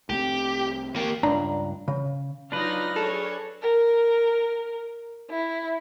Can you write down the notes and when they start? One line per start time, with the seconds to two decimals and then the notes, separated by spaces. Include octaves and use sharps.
0.10 C2 A3 C4 G4
0.96 A#3 G4
1.23 C#2 G2 D4 A#5
1.88 C#3
2.52 F#3 D4 D#4 F4 B4 F6 A#6
2.96 G#4 A4 C#5
3.62 A#4
5.30 E4